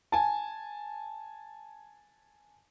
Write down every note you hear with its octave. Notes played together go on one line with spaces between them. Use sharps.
G#5 A5